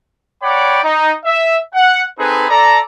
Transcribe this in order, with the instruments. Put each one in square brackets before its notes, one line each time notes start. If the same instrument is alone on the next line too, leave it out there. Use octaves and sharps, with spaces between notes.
[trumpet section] C#5 D5 F#5 G5 B5 D6
D#4
E5
F#5
C4 D#4 G#4 A4 B4
A4 D5 A#5